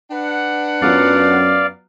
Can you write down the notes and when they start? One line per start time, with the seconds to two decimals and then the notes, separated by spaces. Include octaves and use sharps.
0.11 D4 B4 F#5
0.82 F#2 F#3 B3 F4 D5 F5